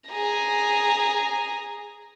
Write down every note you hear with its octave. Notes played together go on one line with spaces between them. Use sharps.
G#4 A#5